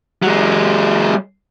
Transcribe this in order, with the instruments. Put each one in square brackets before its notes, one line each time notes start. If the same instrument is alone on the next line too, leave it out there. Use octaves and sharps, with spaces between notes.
[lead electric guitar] F#3 G#3